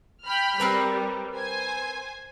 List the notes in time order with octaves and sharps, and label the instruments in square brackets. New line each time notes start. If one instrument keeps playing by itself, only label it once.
[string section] G5 B5 F6
[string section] G3 [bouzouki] C4 A#4 B4
[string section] C5 G#5